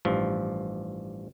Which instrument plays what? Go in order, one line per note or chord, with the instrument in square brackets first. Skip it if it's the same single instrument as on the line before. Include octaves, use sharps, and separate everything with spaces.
[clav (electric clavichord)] A1 G2 F3